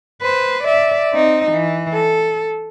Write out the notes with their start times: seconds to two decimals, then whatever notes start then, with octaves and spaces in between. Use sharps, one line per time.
0.22 B4 C5
0.64 D5 E5
1.13 C4 D#4
1.51 E3
1.94 A4